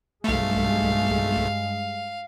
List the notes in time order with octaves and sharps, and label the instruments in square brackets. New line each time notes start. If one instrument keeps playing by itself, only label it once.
[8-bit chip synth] B1 A3 [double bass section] G2 G#3 [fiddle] F5